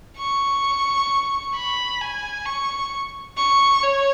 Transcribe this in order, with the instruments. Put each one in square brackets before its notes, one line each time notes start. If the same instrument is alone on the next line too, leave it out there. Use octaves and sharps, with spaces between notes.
[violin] C#6
B5
G#5
C#6
C#6
C#5